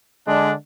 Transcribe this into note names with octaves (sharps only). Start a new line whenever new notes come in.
D3 G#3 D4